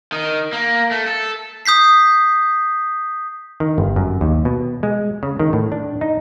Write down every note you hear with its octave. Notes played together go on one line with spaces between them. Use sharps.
D#3
A#3
A3
A4
D#6 G6 B6 C7
D#3
G1
F#2
D#2
B2
G#3
C#3
D#3
A2
D4
D#4